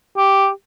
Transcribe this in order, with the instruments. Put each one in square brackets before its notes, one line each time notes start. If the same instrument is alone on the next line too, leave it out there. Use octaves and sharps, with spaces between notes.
[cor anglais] G4